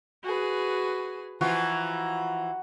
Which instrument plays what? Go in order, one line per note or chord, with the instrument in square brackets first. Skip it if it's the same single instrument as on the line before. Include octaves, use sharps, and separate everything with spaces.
[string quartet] F#4 G#4 B4
[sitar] E3 F3 F4 [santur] F#4 [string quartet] A#5